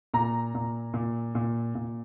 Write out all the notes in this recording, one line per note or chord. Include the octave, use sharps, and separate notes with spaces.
A#2 A#5
A#2
A#2
A#2
A#2